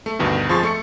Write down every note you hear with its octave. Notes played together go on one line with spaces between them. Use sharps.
A3
D2 G2 B2 D#3
F2 F3 G#4 C6 C#6 A6
A3 C#6 C#7